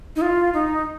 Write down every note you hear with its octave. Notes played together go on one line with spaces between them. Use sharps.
D#4
F4
D#4